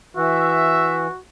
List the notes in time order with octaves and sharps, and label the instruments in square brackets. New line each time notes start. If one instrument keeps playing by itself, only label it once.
[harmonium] E3 [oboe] F#4 [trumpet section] E5